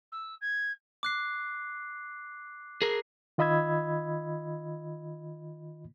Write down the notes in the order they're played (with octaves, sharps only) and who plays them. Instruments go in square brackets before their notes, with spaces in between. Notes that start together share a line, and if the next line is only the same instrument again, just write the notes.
[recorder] E6
G#6
[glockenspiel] D6 F#6 C7
[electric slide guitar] G#4 A#4 [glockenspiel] C7
[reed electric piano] D#3 F4 D#5 B5 E6 G#6